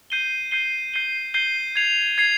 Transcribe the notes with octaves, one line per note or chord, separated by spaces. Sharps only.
G6 C7 D#7 G7
G6 C7 D#7 G7
G6 C7 D#7 G7
G6 C7 D#7 G7
G#6 C7 F7
G#6 C7 F7